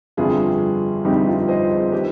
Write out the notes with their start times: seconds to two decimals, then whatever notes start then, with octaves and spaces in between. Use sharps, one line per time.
0.17 G1 F2 C3 G3 F4 G#4
1.04 G1 F2 C3 G3 D#4 G4
1.27 F4
1.48 C5 D#5
1.70 G#4 C5
1.92 D#3 G4 B4